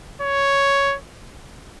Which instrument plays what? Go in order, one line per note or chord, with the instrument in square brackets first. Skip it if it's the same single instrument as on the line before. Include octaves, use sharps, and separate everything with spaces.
[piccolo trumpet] C#5